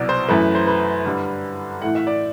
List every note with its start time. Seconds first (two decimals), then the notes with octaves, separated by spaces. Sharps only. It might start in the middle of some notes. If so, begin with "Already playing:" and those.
Already playing: C2 B2 F#3 D5
0.09 C5
0.29 F#2 E3 A3 B4
0.55 C5
0.67 B4
1.05 G2 D3 G3
1.82 A2 E3 A3 F#5
1.95 E5
2.07 D5